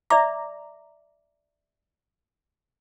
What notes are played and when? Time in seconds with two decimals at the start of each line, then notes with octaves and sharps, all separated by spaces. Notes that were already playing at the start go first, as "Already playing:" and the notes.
0.10 D5 E5 A#5 D6